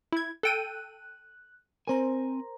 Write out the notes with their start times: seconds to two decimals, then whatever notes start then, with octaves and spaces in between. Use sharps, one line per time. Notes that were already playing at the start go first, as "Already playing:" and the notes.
0.12 E4 G#6
0.43 A4 G5 F#6 D#7
1.88 C4 A#4 C5 G#5 A#5